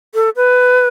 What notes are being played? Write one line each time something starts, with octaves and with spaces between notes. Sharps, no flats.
A4
B4